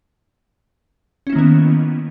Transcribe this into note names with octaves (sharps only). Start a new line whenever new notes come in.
D#3 A#3 B3 C#4 E4